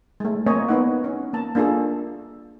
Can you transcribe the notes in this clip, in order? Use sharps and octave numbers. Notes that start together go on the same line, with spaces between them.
G#3 A3
A#3 C4 C#5 D#5 G#5
B3 D#4 F#5
C#4
A#3 A5
A#3 D4 F4 G#4 A4